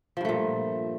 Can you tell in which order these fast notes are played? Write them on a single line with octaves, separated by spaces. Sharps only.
F3 G2 A3 A#2